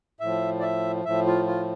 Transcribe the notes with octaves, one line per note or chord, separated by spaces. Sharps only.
A2 F3 E5
D5
E5
A2 F3 E5
F4
F4